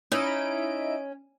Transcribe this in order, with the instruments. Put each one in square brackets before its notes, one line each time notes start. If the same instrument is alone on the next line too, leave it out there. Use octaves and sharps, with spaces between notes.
[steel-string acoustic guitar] C#4 [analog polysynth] D#4 E4 D7